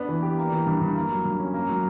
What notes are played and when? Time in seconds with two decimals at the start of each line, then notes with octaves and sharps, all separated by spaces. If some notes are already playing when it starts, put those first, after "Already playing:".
Already playing: B3 D4
0.09 E3
0.23 G4
0.37 A#3
0.52 E3
0.66 G2
0.81 G2
0.96 A#3
1.10 F#3
1.25 G2
1.39 C#4
1.54 A#3
1.69 F#3